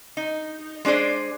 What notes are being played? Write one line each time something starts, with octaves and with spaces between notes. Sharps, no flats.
D#4
G#3 D4 G#4 C5 D5